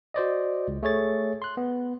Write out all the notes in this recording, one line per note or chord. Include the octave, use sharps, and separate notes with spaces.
F#4 C5 D5 D#5
C#2
A3 G#4 C#5 A6
C6 F#6
B3